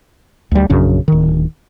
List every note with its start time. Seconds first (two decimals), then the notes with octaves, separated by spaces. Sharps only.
0.52 D2 G3
0.70 A#1 F#2 C#3 D4
1.08 D1 D#3